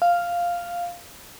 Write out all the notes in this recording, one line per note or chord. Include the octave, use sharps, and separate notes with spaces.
F5